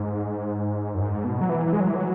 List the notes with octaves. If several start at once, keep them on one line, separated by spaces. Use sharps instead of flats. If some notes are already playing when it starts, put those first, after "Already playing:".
Already playing: G#2
F#2
G#2
B2
F#3
E3
G#3
F#3
E3
F#3